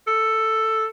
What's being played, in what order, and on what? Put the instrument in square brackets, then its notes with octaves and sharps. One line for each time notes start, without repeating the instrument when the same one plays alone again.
[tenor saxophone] A4